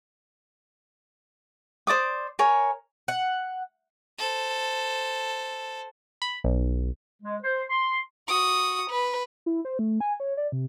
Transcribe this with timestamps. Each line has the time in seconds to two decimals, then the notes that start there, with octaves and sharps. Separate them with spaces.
1.87 C5 D5 D6 D#6
2.39 A#4 C#5 G#5
3.08 F#5
4.19 A4 C5
6.22 B5
6.44 B1
7.22 G#3
7.42 C5
7.70 C6
8.28 F#4 D#6
8.90 B4
9.46 E4
9.65 C5
9.79 A3
10.00 G#5
10.20 C#5
10.37 D5
10.52 C3